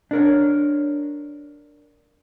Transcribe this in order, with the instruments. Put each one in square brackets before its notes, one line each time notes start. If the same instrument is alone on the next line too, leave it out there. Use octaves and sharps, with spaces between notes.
[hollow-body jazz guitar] D4 A#4 C#5